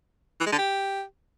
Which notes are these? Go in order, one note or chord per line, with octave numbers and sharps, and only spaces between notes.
E3
G#3
D3
G4